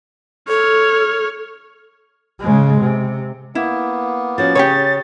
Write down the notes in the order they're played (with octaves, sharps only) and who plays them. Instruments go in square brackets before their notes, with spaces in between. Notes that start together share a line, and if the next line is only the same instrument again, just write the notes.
[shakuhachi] A4 [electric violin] C#5 F6
[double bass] C#3 G#3
C3
[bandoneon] A#3 B3 [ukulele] E4
[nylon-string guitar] F3 C#4 F#4 [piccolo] A6
[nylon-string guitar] C#3 [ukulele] G4 G#4 C#5